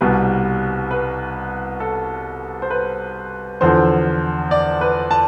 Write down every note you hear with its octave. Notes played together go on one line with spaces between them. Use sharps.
C2 B2 G3 B4
B4
A4
C5
B4
E2 D3 F3 C5
D5
B4
A5